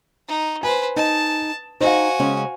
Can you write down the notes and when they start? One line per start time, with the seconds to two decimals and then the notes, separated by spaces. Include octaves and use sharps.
0.28 D#4
0.63 B4 C5 G#5
0.96 D#4 A5
1.81 D#4 F#4 C5 F5 G#5
2.19 C#3 G#3 C#4